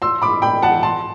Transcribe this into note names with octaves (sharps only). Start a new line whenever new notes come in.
C6 E6
B5 D6
G5 B5
F#5 A5
A5 C6